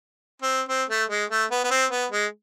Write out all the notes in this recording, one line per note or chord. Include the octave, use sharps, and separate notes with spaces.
C4
C4
A3
G#3
A3
B3
B3
C4
B3
G#3